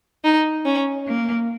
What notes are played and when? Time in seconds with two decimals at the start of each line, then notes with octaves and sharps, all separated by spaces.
0.24 D#4
0.65 C#4
1.07 A#3